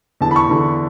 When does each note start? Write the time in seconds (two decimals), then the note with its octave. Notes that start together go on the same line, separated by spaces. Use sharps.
0.21 E2 D3 A5
0.31 B5
0.36 C#6
0.49 E2 D3